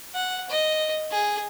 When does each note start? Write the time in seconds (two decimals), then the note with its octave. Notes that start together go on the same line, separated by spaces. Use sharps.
0.14 F#5
0.50 D#5
1.11 G#4